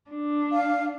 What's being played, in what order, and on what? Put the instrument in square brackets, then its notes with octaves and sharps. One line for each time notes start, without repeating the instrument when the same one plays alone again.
[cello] D4
[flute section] F5